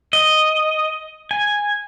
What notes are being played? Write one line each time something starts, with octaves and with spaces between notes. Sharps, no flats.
D#5
G#5